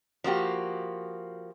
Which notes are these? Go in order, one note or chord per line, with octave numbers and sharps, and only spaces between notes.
F3 A#3 F#4 G4